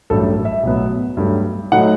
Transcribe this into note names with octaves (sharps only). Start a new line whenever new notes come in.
A1 G2 F#3 A3 A4
E5
B1 A2 F#3 B3
G2 F#3 A3
A2 F#3 A3 D#4 F#5